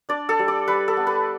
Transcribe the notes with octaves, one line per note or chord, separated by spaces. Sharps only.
D4 D5
A4
G3
D5
G3 B4
A4
B3
B4